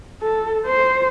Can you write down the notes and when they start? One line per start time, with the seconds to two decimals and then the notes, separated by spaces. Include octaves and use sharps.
0.22 A4
0.66 C5